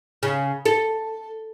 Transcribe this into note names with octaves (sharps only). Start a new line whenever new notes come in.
C#3
A4